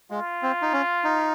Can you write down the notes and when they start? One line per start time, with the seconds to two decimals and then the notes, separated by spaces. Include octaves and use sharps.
0.11 G#3 F4
0.43 C4
0.62 D#4
0.73 C#4
1.04 D#4